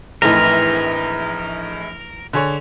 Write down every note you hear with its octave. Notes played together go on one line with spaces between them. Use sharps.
A#1 A2 E3 A3 C4 D#4 A#4
D3 G#4 C#5